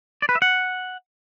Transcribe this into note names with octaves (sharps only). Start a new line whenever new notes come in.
D5
B4
E5
F#5